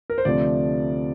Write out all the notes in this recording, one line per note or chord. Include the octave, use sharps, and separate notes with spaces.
A#4
C5
D2 C3 F3 A3 D5